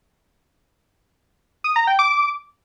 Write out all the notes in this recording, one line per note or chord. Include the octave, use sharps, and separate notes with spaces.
D#6
A#5
G5
D6